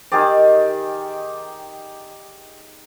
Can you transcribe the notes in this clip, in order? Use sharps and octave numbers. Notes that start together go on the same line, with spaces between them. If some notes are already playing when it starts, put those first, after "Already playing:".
D#3 G4 G#4 D5